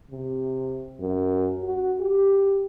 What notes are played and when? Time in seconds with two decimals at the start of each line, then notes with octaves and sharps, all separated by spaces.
0.11 C3
1.00 F#2
1.63 F#4
2.00 G4